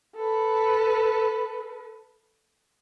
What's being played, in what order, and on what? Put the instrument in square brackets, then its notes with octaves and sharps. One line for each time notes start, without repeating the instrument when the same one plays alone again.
[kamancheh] A4 B4